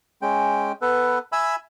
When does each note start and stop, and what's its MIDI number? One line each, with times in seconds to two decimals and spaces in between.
0.22 0.72 56
0.22 0.72 61
0.22 0.72 79
0.82 1.19 59
0.82 1.19 69
0.82 1.19 71
1.32 1.56 76
1.32 1.56 80
1.32 1.56 83
1.32 1.56 88